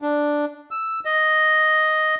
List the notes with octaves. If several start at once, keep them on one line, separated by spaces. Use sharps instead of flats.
D4
E6
D#5